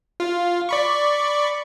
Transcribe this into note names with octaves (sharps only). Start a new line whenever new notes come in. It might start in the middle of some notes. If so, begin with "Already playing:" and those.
F4
D5 B5 C#6